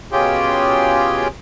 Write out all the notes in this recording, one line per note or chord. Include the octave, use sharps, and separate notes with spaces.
B2 C#4 F4 G4 G#4 G5